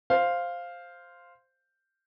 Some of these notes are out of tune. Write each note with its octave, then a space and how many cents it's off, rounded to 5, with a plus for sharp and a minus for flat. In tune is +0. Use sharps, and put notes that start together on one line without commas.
C5 +0 F5 +0